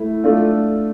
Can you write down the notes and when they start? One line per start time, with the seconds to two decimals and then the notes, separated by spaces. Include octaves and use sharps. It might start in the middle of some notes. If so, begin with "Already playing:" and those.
Already playing: A3 E4
0.24 A3 D4 F4 A4